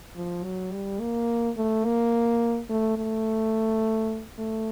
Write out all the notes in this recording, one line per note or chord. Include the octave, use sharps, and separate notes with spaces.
F3
F#3
G3
A#3
A3
A#3
A3
A3
A3